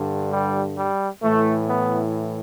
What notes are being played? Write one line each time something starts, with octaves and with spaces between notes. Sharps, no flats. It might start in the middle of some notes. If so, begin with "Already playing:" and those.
Already playing: G2 D3
G3
G3
A2 E3 A3
B3